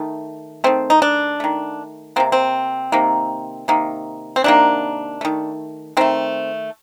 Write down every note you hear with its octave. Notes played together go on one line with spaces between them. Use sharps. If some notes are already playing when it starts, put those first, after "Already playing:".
Already playing: D#3 A3
D#3 A3 C4
D#4
D4
D#3 A3
C3 D#3 A#3 C4
C4
C3 D#3 A#3
C3 D#3 A#3
C4
C3 D#3 A#3 D4
D#3 A3
D#3 A3 C4